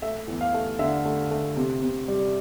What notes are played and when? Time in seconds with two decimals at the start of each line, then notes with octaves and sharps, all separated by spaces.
0.02 A3 E5
0.28 E2
0.41 F5
0.54 A3
0.79 D3 E5
1.05 A3
1.31 A3
1.56 C3
1.82 C3
2.08 G3